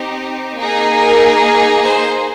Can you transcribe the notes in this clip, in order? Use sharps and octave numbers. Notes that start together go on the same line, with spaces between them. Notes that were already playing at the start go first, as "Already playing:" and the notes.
Already playing: C4 D#4 G4
A#3 D#4 G#4
A#4
C5